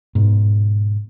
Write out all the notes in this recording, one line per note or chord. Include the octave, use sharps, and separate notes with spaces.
G#2 B2